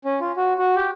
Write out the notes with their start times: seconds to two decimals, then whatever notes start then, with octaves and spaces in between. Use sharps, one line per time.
0.05 C#4
0.21 F4
0.37 F#4
0.59 F#4
0.76 G4